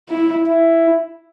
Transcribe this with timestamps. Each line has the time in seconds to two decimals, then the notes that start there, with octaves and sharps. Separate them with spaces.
0.09 E4
0.46 E4